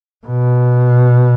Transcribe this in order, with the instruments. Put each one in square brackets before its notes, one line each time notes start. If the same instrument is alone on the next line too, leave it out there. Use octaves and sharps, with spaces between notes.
[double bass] B2